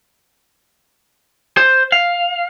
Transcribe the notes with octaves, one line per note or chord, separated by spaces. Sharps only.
C5
F5